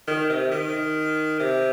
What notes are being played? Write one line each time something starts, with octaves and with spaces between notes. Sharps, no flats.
D#3
C3
D#3
C3